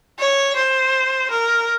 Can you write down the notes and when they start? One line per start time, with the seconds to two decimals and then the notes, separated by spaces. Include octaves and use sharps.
0.19 C#5
0.56 C5
1.31 A#4